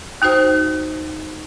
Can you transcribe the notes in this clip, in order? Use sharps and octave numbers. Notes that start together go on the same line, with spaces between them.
D#2 D#4 F#4 C5